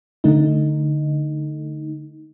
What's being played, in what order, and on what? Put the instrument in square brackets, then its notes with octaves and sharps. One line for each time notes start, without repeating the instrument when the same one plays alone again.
[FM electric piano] D3 A3 D#4